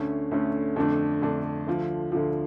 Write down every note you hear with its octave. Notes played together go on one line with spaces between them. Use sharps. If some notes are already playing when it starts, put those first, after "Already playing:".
Already playing: D2 D3 A3 C#4
D2 D3 A3 C#4
F2 D3 A3 D4
F2 D3 A3 D4
D2 D3 F3
D2 D3 F3